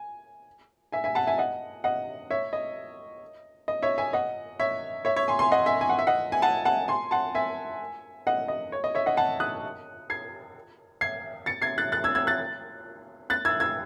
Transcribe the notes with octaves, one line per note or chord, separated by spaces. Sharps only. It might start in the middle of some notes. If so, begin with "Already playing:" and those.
Already playing: G#5
E5 G#5
E5 G#5
F#5 A5
E5 G#5
D#5 F#5
D#5 F#5
C#5 E5
D#5
D#5
C#5 E5
E5 G#5
D#5 F#5
C#5 E5
C#5 E5
C#5 E5
G#5 C6
G#5 C6
D#5 F#5
E5 G#5
G#5
F#5
E5
D#5 F#5
G#5
F#5 A5
F#5 A5
G#5 C6
F#5 A5
E5 G#5
D#5 F#5
D#5
C#5
D#5
C#5 E5
D#5 F#5
F#5 A5
D#6 F#6
G#6 C7
G#6 C7
A6 C#7
G#6 C7
F#6 A6
F#6 A6
E6 G#6
E6 G#6
F#6 A6
F#6 A6
E6 G#6
E6 G#6